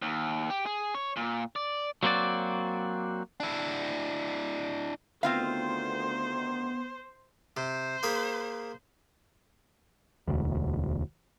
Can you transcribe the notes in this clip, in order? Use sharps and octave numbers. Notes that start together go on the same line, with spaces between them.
D#2
G4
G#4
C#5
A#2
D5
F#3 A#3 C4 F#4 D5
D4 E4
D2 D#3 B3 C4 F4 C5 F5
C3 C5
A#3 G#4 B5
E1 D2